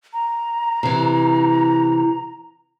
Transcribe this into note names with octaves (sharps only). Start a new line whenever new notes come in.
A#5
C3 E3